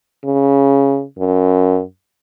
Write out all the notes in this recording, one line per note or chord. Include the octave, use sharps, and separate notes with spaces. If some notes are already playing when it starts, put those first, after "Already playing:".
C#3
F#2